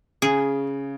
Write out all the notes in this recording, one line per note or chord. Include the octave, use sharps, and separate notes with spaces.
C#3 G#4